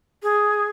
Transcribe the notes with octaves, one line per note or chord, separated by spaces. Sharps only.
G#4